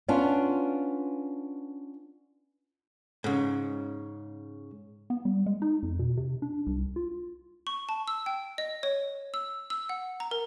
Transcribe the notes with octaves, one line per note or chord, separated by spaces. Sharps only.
B3 C#4 D4 F4
G#2 C#3
B3
G3
G#3
D#4
F2
B2
C3
D4
C2
F4
C#6
A5
E6
G5
D#5
C#5
E6
E6
F#5
A#5
A#4